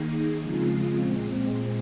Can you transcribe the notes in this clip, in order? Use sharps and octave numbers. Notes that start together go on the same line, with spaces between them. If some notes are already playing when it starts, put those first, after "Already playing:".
Already playing: D#3 A#3 D#4 G#4
C#3 F3 G#3 C4 F4
A#2 G#3 C4